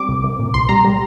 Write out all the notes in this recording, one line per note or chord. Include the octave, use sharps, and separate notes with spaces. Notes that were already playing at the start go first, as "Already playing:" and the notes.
Already playing: G3 C4 D6
C2
C2
A#2
C2 C6
G3 A#5
G3